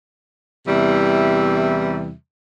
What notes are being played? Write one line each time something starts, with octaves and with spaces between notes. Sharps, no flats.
E2 C3 E3 G3 E5